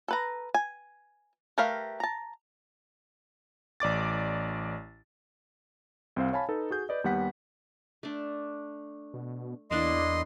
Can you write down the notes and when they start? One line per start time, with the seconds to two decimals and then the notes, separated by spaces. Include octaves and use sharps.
0.08 A4 B4 A#5
0.54 G#5
1.58 A3 G4 A#4 B4 F5
2.00 A5 A#5
3.80 A1 D5 D6 A6
6.16 C2 C4 C5 F5
6.33 C#5 F5 G#5 A5 B5
6.49 D#4 A4 B4
6.70 F#4 G#4 G6
6.89 B4 D5 D#5
7.04 D#2 G3 B3 F#5 B6
8.03 A3 D4
9.14 B2
9.71 E2 A#3 D4 E4 D#5 C6